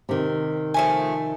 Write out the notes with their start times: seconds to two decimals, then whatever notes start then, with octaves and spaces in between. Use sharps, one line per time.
0.09 C3 D#3
0.74 F3 A3 G#5